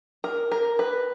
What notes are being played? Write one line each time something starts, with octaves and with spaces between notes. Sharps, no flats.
A#4
A#4
B4